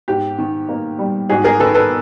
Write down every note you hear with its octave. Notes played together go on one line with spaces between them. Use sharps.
G#2 G4
D#3
A#3
G3
G#2 F#4 G#4
G#4 A#4
D#3 A4 B4
A4 B4